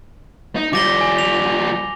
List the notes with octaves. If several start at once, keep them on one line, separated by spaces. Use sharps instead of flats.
D#4
F3 G3 D6 A#6 G7
G#5
F7